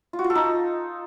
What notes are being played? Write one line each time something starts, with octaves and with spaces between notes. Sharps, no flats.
F4
F#4
F4
A4
D#4